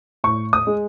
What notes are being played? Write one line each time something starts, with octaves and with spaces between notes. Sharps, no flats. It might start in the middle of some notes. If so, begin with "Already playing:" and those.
A2 C#6
D#6
G#3